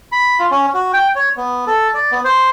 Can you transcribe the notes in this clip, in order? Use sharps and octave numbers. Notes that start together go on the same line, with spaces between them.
B5
F4
C#4
F#4
G5
C#5
B3
A4
D5
B3
C5